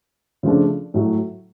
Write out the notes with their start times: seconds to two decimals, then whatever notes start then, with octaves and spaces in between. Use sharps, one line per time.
0.43 C#3 F3 A3 D4
0.94 A2 F#3 A3